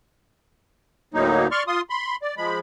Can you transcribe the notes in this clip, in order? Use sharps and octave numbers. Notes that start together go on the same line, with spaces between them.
D2 A2 F#3 A#3 D#4
D5 C6 C#6 F6
F4 C6 D#6
B5 C6
D5
F3 G#3 B5